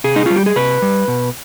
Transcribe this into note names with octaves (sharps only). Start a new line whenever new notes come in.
C3 G#4
D#4
G3 F4
G4
G#4
C3 B4
G3
B2